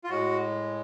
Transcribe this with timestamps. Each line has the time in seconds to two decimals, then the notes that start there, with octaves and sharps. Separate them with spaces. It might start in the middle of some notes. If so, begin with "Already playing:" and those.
0.04 F4
0.09 A2 G#3 F#4